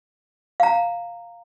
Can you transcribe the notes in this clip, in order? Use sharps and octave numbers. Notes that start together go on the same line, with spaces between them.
F5 A#5